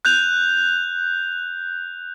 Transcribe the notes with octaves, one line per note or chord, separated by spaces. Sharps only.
F#6 G6 F7